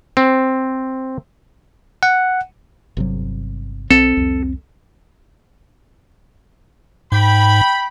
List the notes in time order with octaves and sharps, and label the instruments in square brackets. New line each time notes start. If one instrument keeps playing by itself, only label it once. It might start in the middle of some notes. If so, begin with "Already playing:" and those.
[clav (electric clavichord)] C4
[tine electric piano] F#5
[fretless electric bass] G1 C3 F#3
[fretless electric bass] B1 [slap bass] C4 [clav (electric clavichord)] A4
[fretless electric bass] C2 F2
[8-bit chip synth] G#2 [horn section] G5 B5